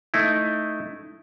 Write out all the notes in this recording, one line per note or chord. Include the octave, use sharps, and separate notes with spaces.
A3 D#4 E4